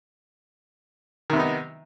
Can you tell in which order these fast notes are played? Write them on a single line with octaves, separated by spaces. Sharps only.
D#3 C3 B3 D#4